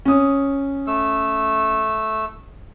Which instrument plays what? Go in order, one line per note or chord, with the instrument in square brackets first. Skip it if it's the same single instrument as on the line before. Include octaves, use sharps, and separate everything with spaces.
[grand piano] C#4 D#6
[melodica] A3 E6